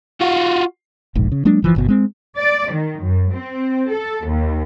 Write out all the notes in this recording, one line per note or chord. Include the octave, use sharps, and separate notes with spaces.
F4 F#4
E1 A#1 G#2
C#3
F#3 G#3 A#3 D4
F#1 E3 F3
G1 B2
G#3 C4
D5
D#3
F#2
C4
A4
D#2